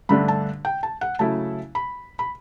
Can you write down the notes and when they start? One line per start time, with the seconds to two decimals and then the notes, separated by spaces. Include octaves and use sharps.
0.09 G2 D3 A3 D4 B5
0.28 A5
0.65 G5
0.83 A5
1.01 F#5
1.19 C#3 F#3 A3 E4 A5
1.75 B5
2.19 B5